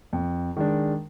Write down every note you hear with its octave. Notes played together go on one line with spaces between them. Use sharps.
F2
D#3 G#3 D4